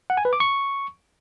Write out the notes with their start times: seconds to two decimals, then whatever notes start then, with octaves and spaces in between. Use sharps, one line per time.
0.10 F#5
0.17 G#5
0.25 B4
0.33 D6
0.40 C#6